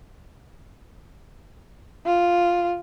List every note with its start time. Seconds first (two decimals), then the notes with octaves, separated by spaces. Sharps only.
2.05 F4